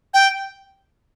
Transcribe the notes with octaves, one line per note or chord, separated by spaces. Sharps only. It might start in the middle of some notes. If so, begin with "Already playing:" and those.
G5